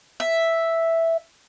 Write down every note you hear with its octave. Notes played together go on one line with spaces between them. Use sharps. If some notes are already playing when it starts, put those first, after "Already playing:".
E5